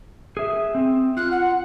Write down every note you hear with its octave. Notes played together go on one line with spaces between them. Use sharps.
G#4 E5
C4
F4 F#6
F#5